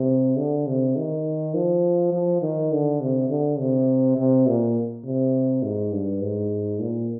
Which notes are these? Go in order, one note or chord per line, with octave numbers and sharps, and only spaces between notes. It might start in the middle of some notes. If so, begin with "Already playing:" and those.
Already playing: C3
D3
C3
D#3
F3
F3
D#3
D3
C3
D3
C3
C3
A#2
C3
G#2
G2
G#2
A#2